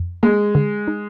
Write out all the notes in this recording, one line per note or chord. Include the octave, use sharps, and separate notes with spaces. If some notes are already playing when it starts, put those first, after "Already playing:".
Already playing: F2
G#3 A#3
D3
D#4